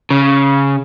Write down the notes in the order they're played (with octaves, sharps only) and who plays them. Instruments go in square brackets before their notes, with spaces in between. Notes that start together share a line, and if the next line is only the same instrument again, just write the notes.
[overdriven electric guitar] C#3